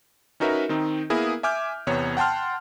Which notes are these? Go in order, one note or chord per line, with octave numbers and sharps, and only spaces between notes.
C#4 D#4 F#4 A#4 B4 E5
D#3 C4 D#4
A#3 B3 E4 G#4 A#4
E5 G#5 D6 F6 G6
E2 C3 B3 C#5
F#5 G5 A5 C6 F6